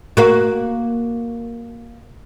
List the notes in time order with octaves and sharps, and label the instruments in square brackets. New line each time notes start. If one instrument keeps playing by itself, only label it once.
[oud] A#3 F#4